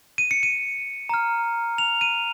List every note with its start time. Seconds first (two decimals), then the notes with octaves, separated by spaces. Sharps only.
0.18 D#7
0.31 C#7
0.43 D#7
1.09 A#5 F6
1.78 F7
2.01 D#7